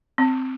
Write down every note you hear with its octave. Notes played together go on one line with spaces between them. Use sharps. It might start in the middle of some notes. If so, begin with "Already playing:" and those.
C4